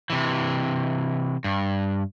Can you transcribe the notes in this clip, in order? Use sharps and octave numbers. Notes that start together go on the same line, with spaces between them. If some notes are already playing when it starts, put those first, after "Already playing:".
C3 E3
G2